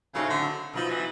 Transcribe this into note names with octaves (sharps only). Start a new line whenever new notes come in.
A2 C#3 F#3 A3 C4 D#4
D3
B2 F3 F#3 B3 D#4
E3